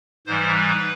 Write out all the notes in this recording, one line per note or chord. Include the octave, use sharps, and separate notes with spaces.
G#2 E3 G3 C5
B4